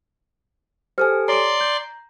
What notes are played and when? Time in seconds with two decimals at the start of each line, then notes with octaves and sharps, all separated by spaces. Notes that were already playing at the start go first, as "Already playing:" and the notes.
0.98 G4 A4 C5 G#5 F6
1.28 C#5 D5 A#5 C6 D7
1.61 G6